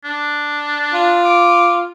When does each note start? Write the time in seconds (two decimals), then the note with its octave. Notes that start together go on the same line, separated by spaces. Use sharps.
0.04 D4
0.93 F4
1.25 D6